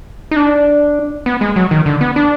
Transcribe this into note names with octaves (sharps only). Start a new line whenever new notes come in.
D#4
D4
B3
G#3
F#3
D#3
D3
B3
D4